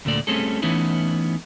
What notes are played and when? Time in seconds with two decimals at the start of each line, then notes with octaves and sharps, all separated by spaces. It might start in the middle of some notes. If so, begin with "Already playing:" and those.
0.05 D2 A#2 A3 D5
0.27 G3 A3 C4 C#4 G#4 A4
0.62 E3 A3 B3 C#4 D#4 E4